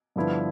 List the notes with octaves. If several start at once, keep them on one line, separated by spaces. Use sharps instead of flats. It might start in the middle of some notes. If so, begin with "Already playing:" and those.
G2 D3 F3 B3 E4